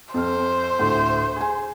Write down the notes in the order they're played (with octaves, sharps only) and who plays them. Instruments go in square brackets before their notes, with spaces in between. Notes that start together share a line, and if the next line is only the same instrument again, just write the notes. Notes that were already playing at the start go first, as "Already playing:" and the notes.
[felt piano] F2 F6 [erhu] C5
[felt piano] D2 A2
G#4 G#5